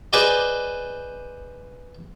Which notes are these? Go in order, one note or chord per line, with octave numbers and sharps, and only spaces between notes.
G#4 B4 C5 D5 D#5